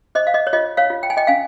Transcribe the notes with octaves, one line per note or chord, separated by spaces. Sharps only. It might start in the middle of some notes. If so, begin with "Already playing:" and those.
C5 D#5
F5
D#5
C#5
F4 D#5
C#5 F5
F4
G5
G#5
D#5 G5
C#4 F5 G#5